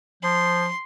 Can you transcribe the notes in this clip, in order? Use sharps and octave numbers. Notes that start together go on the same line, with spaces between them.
F3 C6